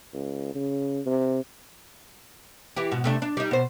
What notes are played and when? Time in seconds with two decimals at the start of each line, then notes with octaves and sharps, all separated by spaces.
0.14 C#2
0.55 C#3
1.06 C3
2.77 E3 E4 G4
2.91 G#2 B2
3.04 C3 A3 D4
3.22 D4
3.37 G3 D#4
3.51 B2 C5